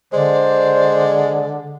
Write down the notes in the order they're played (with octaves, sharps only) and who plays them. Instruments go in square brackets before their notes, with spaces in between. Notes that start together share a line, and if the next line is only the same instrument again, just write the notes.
[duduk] D3 [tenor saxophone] G#3 [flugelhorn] C5 [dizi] D5